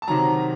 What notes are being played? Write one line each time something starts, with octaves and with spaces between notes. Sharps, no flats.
A5
C3 D#3 F#3 A#5